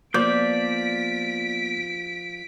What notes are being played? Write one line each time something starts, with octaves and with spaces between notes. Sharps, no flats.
F3 A#3 B3 D5 D6 G6 B6 D7